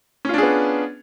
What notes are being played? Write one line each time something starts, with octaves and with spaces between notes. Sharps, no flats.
B3 C#4 D4 F4 G#4